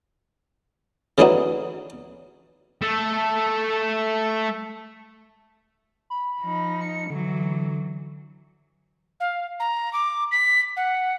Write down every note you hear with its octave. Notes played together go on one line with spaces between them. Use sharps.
C#3 E3 A3 D4 D#4 F#4
A3 A4
B5
F3 D#4
C#7
D3 E3 F#3
F5
A#5
D6
B6
F#5